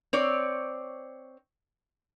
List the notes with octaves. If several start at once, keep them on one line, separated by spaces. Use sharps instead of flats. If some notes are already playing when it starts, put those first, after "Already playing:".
C4 C#5 D5